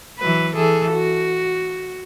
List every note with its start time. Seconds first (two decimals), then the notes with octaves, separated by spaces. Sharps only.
0.19 E3 F#3 B4
0.56 E3 G#4 A4
0.92 F#4